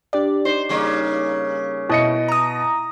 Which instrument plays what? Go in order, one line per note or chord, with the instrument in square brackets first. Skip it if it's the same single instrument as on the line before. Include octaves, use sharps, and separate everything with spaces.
[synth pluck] D4 G4 D5
[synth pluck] D#4 [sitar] C5
[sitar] C#3 G3 A#3
[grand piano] B2 D#5 C#7 [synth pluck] E4
[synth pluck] A#5 D#6